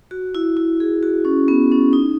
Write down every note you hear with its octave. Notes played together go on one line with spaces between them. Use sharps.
F#4
E4
E4
G#4
F#4
C#4
B3
C#4
D#4